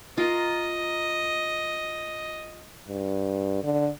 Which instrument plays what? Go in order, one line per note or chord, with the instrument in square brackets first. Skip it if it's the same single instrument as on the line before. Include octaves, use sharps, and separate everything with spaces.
[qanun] F4 A#4 [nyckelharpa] D#5
[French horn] G2
D3